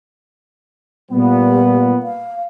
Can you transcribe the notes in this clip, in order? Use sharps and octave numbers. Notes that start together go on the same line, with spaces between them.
A#2 G3 B3
F5